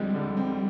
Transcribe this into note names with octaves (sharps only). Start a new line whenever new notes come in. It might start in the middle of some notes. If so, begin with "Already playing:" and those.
Already playing: D3 F3 G3 G#3 C4
D3
C4